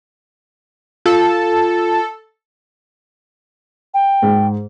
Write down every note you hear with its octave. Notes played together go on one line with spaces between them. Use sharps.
F4 A4
G5
G#2